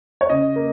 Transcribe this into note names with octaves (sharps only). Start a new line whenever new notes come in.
C#5
C#3 D#5
A#3